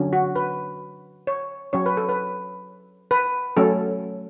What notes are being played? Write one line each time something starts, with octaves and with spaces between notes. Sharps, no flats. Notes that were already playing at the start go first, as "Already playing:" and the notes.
Already playing: D3 F#3 C#4
F#4
B4
C#5
F#3 C#4 C#5
B4
A4
B4
B4
F#3 A3 C#4 A4